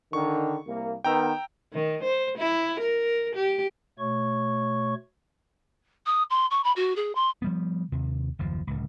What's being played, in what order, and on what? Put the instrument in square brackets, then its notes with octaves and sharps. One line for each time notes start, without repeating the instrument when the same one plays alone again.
[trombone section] D3 D#3 [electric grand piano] C#6
[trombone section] C2 A#3
[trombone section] D#3 B3 [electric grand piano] G5 A#5 E6
[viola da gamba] D#3
C5
E4
A#4
G4
[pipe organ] B2 A3 C#5 C#6
[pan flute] D#6
C6
C#6
B5
F#4
G#4
C6
[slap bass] F3 G3 B3
D#2 C3
F#1 D#2 F3
D1 C#2